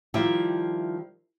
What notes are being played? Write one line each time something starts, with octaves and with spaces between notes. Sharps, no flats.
D#3 F3 G3 E4 G4 E5